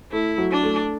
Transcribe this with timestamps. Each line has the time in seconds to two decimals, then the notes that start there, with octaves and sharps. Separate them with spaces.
0.12 A3 E4
0.38 F#3
0.51 D4
0.63 A3